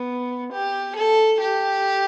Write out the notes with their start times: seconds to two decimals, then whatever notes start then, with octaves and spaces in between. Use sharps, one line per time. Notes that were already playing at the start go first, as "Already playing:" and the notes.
Already playing: B3
0.52 G4
0.96 A4
1.41 G4